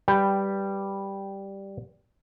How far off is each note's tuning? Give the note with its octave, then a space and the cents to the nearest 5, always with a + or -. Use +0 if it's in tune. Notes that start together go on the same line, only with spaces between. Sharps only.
G3 +0 B4 +0 G5 +0